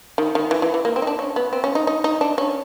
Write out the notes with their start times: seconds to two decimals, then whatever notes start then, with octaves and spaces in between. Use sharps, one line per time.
0.18 D#3
0.35 D#3
0.51 E3
0.62 E3
0.74 E3
0.85 A#3
0.96 C4
1.02 D#4
1.07 D4
1.19 C#4
1.36 B3
1.53 C4
1.64 C#4
1.75 D#4
1.87 D#4
2.04 D#4
2.21 D4
2.38 C#4